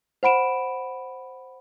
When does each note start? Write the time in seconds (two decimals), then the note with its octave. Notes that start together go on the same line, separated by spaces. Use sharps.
0.23 C5 F#5 B5 D7 E7